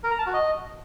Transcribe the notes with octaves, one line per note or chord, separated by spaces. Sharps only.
A#4
A#5
A5
F#4
D#5